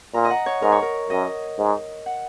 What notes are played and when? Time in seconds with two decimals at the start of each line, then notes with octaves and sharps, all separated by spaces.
0.14 A#2 A#5
0.25 D#5
0.30 F#5
0.46 C#5
0.62 G#2 A#4
0.72 C#5
0.82 A#4
1.10 F#2 D#5
1.58 G#2
2.06 F#5